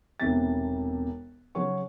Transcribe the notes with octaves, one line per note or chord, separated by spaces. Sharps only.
E1 B1 C3 A6
C#3 F#3 G#4 C#5 C#6